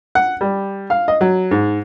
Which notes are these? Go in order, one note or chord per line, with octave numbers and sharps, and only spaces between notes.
F#5
G3
F5
D#5
F#3
G#2